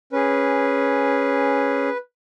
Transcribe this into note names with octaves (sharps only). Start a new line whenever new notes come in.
C#4 G#4 B4